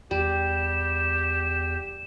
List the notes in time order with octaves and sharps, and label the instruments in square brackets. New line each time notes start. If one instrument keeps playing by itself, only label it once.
[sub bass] E2 [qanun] G3 [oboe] G4 [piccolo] E7